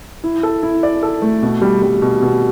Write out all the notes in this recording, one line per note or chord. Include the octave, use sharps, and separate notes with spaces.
E4
A4
E4
D5
A4
A3
B2
G3
G3
B2
B2